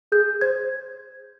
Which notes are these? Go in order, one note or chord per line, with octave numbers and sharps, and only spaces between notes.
G#4 G6
C5 G#6